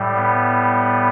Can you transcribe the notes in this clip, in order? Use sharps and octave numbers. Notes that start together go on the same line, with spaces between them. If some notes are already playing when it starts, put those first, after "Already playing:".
Already playing: A2 G3
B3